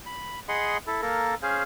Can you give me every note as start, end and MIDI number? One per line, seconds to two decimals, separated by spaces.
0.06 0.40 83
0.49 0.77 68
0.49 0.77 75
0.49 0.77 78
0.49 0.77 83
0.49 0.77 84
0.87 1.01 64
0.87 1.01 69
1.02 1.35 58
1.02 1.35 69
1.02 1.35 70
1.43 1.63 61
1.43 1.63 68
1.43 1.63 72
1.43 1.63 77